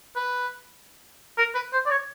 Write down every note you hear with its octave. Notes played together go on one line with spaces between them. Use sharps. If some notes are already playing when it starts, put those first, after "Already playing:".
B4
A#4
B4
C5
D5
C#5